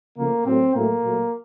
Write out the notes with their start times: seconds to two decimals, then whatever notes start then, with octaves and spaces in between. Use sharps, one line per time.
0.17 C#3 F3 A3 A#3
0.45 A2 F#3 A3 C4
0.74 A2 F#3 A3 A#3
1.02 A#2 F#3 A3